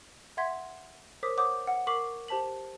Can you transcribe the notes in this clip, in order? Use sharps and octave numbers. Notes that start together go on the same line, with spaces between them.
E5 F#5 C6 G#6 B6
A#4 C5 C#5 D6 D#6 B6
C#5 F#5 D6 D#6 G6
F#5
A#4 C#6 D6 B6 C7 F#7
G4 C5 A5 B6 F#7